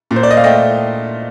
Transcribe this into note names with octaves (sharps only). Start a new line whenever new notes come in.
A#2
C5
D5
D#5
F5
A3 D#5 G5